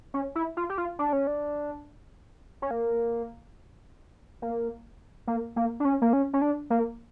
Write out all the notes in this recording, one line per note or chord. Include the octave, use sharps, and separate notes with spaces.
C#4
E4
F4
G4
F4
D4
C#4
D4
C#4
A#3
A#3
A#3
A#3
D4
C#4
A#3
C#4
C#4
D4
A#3